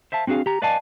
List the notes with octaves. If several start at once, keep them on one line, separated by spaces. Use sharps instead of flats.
C5 E5 F5 A5
C4 D4 F#4 G#4 F5
G4 A#5
B4 D5 D#5 F5 G#5 A5